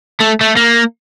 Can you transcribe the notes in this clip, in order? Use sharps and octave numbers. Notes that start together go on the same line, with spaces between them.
A3
A3
A#3